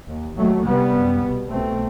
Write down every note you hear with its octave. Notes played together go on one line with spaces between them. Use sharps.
D#2
D#2 F#3 A3
C2 C3 G3 B3
F#2
C2 B2
C2 B2 A3 C4